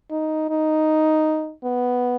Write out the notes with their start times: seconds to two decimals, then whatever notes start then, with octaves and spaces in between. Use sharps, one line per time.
0.10 D#4
0.49 D#4
1.64 B3